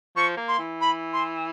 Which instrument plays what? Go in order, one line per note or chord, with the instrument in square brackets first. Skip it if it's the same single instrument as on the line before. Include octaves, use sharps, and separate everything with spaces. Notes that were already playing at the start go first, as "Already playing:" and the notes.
[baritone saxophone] F3 [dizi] C#6
[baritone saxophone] A#3
[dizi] C6
[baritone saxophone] E3
[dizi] B5
C6